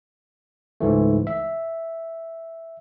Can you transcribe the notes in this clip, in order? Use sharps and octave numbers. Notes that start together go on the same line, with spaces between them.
C#2 G#2 E3 A3
E5